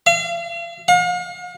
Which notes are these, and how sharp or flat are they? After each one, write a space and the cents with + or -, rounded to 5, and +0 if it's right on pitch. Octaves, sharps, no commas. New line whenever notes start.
F5 -40
F5 +45